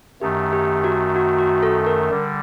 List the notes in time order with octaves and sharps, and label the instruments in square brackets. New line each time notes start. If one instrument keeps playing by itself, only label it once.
[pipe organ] F#2 D#3 A3 [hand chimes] G4
[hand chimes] G4
F#4
F#4
F#4
A4
A#4
[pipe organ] D3 G3